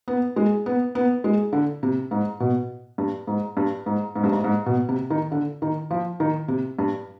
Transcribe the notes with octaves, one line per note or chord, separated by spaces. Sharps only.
B3
G#3
B3
B3
G#3
D3
C3
G#2
B2
G2
G#2
G2
G#2
G#2
G2
G#2
G#2
B2
C3
D#3
D3
D#3
F3
D#3
C3
G2